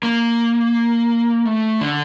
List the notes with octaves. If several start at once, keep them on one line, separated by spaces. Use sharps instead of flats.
A#3
A3
D3